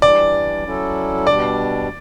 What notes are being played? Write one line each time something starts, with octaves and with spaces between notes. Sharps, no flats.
E3 G3 D4 D5
F#3 C#4 E4 A4
B2 G3 D4 D5